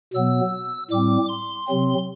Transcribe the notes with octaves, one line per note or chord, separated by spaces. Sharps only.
B2 F#3 B3 E6
A2 G3 C4 D6
C6
C3 F#3 C4